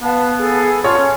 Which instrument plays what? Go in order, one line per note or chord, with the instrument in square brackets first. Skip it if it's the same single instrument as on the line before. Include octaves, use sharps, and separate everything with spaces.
[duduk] B3 [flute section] B4 F5 A5
[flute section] G#4 A4
[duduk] F4 [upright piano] C#5 A5 [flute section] F#5
[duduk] C#4